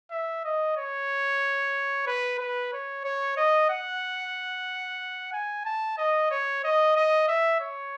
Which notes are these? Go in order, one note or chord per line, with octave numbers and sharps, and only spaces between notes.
E5
D#5
C#5
B4
B4
C#5
C#5
D#5
F#5
G#5
A5
D#5
C#5
D#5
D#5
E5
C#5